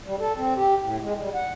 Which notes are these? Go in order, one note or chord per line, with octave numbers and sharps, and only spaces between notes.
G3
A4
C4
G4
A2
G#3
G3
F#5